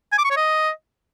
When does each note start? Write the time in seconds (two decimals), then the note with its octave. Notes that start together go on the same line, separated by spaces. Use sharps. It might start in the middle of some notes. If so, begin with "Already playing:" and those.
0.12 G#5
0.18 D6
0.24 C#6
0.31 C#5
0.37 D#5